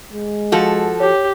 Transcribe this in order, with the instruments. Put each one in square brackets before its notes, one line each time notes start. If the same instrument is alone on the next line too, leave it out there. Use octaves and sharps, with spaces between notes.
[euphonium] G#3
[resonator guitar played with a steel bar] F3 F#4 A4
[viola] G4 [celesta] C#5